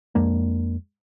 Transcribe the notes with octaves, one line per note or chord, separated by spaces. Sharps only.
F2 G#3 A#3 D4